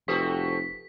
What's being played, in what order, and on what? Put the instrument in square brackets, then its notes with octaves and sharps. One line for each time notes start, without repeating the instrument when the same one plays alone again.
[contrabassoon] F1 [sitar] A3 C4 F#4 [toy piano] G4 A4 B4 [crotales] B6